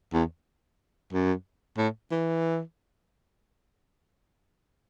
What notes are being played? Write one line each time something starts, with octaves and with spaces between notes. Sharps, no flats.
E2
F#2
A2
E3